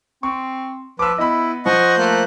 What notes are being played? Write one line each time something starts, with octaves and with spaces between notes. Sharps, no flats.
C4 C#6
F3 B4 D6 E6
B3 E4 D#5 B5
F3 C5 D#5 F#5 C#6
A3 A#3 F#6